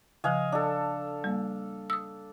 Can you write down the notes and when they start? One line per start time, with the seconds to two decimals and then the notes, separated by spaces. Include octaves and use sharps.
0.24 C#3 F3 D#5 F5 G#5
0.52 D4 A4
1.24 G3 A#3
1.90 D#6 E6